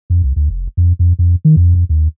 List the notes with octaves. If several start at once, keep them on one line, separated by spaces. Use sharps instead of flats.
F2
C2
D2
F1
F2
F2
F2
D#3
F2
F2
D#2